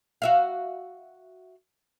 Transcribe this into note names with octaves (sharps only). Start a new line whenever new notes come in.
F#4 E5 F5